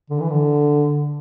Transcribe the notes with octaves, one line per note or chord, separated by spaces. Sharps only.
D3
E3
D3